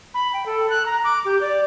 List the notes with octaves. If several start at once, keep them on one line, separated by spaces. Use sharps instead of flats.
B5
G5
A4
F#6
A#5
D6
G4
D5